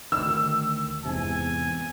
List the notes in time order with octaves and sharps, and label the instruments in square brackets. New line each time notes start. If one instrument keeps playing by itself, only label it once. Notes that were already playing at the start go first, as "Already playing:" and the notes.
[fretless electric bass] D2 D#3 [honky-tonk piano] E6
[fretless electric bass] E2 G#2 C3 [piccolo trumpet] G#5